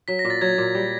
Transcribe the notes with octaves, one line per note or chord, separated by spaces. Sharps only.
F#3 B6
A#6
A#2
A6
F#3 G#6
A#2
G3